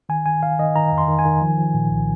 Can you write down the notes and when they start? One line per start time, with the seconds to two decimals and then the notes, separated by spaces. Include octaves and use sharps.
0.09 D#3 G#5
0.25 D#3 G#5
0.42 D#3 F5
0.59 D#3 D#5
0.75 D#3 A#5
0.92 F2
0.98 C6
1.08 D#3
1.19 G#5
1.25 D#3
1.42 F3
1.58 F3
1.74 A#2
1.90 C2